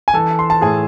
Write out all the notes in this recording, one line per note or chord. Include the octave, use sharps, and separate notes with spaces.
G#5
E3 A4 A5
C6
A5
A2 G#4 G#5